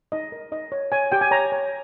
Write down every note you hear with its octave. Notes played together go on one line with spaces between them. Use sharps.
D#4 D#5
A#4
D#4 D#5
C#5
C#5 G#5
G4 G5
G#5
C#5 A#5
C#5